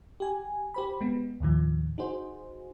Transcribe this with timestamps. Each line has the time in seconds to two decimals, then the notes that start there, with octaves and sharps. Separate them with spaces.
0.20 G4 G#5
0.74 G4 C5 B5
1.01 G#3 B3
1.40 D#2 A2 D#3 F3
1.98 D#4 F#4 G#4 C5